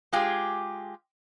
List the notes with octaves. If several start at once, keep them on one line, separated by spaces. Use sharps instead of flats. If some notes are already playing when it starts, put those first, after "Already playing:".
G#3 F4 G4 G#4